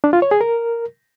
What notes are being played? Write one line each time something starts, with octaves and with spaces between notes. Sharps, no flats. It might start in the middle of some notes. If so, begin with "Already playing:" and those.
D4
F4
C#5
G#4
A#4